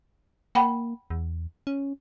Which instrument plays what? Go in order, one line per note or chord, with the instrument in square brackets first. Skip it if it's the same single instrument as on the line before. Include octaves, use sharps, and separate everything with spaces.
[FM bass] A#3 [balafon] F#5 G5 B5
[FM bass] E2
C#4